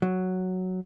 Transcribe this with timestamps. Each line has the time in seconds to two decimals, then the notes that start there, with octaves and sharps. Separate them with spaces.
0.02 F#3